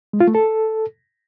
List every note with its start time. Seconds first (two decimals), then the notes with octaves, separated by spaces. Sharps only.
0.13 G#3
0.20 F4
0.28 A3
0.35 A4